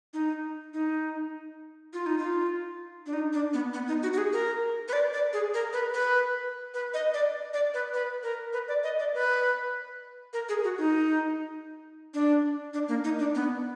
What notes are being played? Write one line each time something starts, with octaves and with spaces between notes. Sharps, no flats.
D#4
D#4
F4
D#4
F4
D4
D#4
D4
B3
B3
D#4
F#4
F#4
G#4
A#4
B4
D5
D5
G#4
A#4
B4
B4
B4
D#5
D5
D5
B4
B4
A#4
B4
D5
D#5
D5
B4
A#4
G#4
F#4
D#4
D4
D4
A#3
D#4
D4
B3